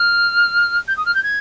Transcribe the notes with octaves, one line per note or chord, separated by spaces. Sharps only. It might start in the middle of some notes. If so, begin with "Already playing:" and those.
Already playing: F6
G6
D#6
F6
G6
G#6